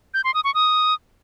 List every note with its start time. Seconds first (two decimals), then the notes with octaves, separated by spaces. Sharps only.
0.14 G6
0.24 C6
0.34 D#6
0.44 C#6
0.54 D#6